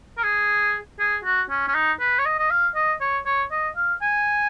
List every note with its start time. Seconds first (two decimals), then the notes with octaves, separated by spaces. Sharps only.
0.18 A#4
0.24 G#4
0.99 G#4
1.24 F#4
1.50 C#4
1.68 C#4
1.75 D#4
2.00 B4
2.19 C#5
2.25 D#5
2.39 D#5
2.50 F5
2.76 D#5
3.01 C#5
3.26 C#5
3.51 D#5
3.76 F5
4.02 G#5